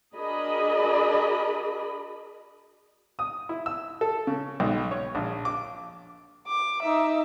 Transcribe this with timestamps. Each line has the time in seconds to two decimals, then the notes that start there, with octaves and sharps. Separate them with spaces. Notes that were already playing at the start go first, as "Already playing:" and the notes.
0.15 D4 F#4 G#4 A#4 D#5 B5
3.19 D#6
3.49 E4
3.66 E6
4.01 A4
4.27 C#3
4.60 B1
4.91 C#5
5.15 A#1
5.45 D6
6.47 D6
6.82 D#4 E5